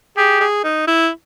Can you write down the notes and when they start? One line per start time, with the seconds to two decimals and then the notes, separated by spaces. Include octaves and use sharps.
0.17 G4 G#4
0.40 G#4
0.64 D#4
0.87 E4